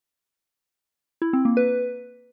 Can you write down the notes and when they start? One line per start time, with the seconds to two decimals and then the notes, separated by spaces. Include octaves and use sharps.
1.22 E4
1.33 C4
1.45 A#3
1.57 B4